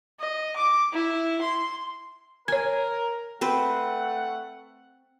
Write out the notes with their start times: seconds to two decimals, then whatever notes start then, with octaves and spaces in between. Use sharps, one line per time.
0.20 D#5
0.56 D6
0.93 E4
1.41 C6
2.48 A#4 C#5 G#5 G#6
3.41 A3 C4 B4 C5 F#5